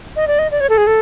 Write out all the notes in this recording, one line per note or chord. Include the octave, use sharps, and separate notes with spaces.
D#5
D5
D#5
D5
C#5
A4
G#4
A4